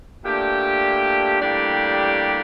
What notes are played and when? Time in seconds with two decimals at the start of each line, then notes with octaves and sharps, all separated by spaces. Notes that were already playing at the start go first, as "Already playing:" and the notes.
0.24 A#2 A3 D4 G4
1.40 A2 G3 A#3 D4 G4